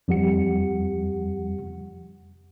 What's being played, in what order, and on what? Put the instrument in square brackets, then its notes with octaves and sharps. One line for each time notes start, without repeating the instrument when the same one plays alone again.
[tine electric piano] F2 F3 G3 G4 F#5 C#7